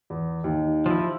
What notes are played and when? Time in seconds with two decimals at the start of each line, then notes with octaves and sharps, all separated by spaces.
0.10 E2
0.44 D#2 D#4
0.86 F3 E4